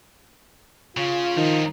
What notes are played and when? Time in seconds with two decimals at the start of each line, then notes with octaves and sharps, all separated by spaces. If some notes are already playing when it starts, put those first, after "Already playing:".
0.97 C#3 F4
1.37 D#3 F3 D#4